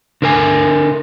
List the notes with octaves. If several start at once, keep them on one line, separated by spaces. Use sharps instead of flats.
D3 A#4 G#5